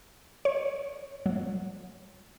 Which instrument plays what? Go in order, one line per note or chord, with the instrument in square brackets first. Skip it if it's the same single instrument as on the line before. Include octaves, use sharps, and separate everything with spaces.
[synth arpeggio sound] C#5
F#3